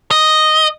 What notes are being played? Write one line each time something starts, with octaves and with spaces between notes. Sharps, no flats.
D#5